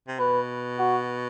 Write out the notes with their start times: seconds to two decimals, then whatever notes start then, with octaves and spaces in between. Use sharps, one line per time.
0.08 C3
0.19 B2 B4
0.79 F#4